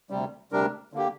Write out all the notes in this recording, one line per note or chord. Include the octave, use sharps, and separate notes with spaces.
D2 C3 G3
D2 C3 G3 D4 A#4
D3 A#3 G4